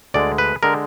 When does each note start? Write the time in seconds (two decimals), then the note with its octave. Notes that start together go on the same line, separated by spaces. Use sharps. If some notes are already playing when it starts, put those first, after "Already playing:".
0.14 D2 D3 G#3 D5
0.38 B4
0.63 D3 G#3 A#4